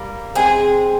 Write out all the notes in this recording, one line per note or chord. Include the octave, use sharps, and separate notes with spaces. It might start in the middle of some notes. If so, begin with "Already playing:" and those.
Already playing: G3 A#3
G#3 C4 G#4